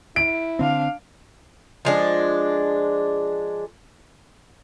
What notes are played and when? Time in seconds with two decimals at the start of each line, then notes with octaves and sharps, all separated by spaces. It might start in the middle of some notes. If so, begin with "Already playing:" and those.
0.16 E4 D7
0.59 D3 C4 D4 F5
1.85 F3 G#3 D4